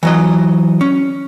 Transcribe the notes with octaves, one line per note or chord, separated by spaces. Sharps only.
E3 F#3 D#5
C#4